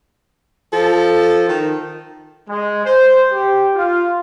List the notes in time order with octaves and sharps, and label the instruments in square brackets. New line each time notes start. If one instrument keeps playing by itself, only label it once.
[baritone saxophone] F3 [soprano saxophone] A4
[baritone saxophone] D#3
[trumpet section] G#3
C5
G4
F4